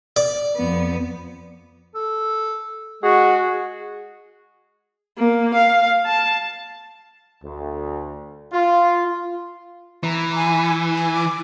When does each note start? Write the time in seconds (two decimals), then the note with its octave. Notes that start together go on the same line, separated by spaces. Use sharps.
0.16 D5
0.56 F2 B3
1.95 A4
3.03 G#3 F#4 G#4
5.17 A#3
5.54 F5
6.06 A5
7.43 D2
8.53 F4
10.04 E3 A#5
10.35 G#5
10.96 G#5
11.15 D6